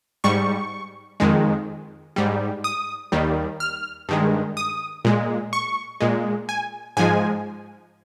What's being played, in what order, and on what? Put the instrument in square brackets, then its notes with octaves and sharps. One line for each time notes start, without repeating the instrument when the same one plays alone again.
[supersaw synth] G#2 G3 C#6
F2 D#3 G#3
G#2 G3
D#6
D#2 D#3 G3
F6
G2 D#3 G#3
D#6
A#2 G#3
C#6
A#2 G#3
G#5
G#2 F3 G#3 G#5